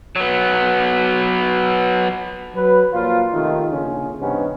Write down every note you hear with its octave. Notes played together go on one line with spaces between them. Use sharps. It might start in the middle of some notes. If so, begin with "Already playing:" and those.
F#3 B3
F#3 B4
A#2 F3 F#3 F4
C3 D#3 A3 D#4 F4
A#1 C#3 C#4
G2 C3 D#3 B3 C#4